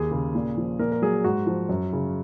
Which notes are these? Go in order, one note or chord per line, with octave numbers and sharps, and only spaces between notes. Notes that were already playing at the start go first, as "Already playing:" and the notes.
Already playing: D#2 G#4
C#3
A#2
F3
A#2 A#4
A#4
F#3 G#4
G#2 F#4
F3
F#2
C#3